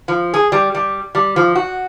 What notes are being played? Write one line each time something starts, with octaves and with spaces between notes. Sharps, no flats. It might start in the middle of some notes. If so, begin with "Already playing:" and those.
F3
G#4
G3
G3
G3
F3
F#4